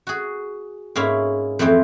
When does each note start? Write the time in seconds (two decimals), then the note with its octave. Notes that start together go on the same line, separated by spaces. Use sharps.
0.07 F#4 G#4
0.96 G#2 A#3 C#4 E4
1.59 F2 E3 A3 C4